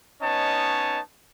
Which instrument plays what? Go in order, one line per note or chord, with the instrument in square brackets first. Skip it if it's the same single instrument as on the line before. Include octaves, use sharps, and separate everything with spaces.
[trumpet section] B3 C#4 D#4 C#5 D#5 A5